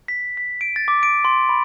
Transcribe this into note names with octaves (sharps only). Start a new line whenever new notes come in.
B6
B6
D7
A6
D6
D7
C6
B5